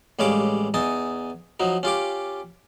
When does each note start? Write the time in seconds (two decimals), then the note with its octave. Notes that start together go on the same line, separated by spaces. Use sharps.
0.19 A1 G3 G#3 C#5 F5 D6
0.74 E2 D#4 G#5 A5 D#6
1.60 F3 F#3 D#4
1.83 C#4 F4 G4 D6